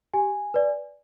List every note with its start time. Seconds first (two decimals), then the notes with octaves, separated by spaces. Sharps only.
0.14 G4 G#5
0.54 B4 D5